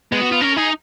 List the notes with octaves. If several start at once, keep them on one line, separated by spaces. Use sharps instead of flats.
G#3 B3
F#4
F4
C#4 A#4
D#4 G#4